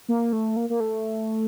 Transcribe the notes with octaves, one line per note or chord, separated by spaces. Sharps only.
A#3
A3
A#3
A#3
A3